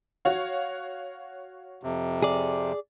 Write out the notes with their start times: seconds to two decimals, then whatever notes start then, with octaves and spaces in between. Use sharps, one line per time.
0.25 F#4 C#5 F5
1.83 F2 C3
2.23 G#4 D5